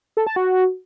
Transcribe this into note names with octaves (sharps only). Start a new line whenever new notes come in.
A4
A5
F#4